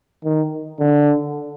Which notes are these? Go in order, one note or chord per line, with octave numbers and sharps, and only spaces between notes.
D#3
D3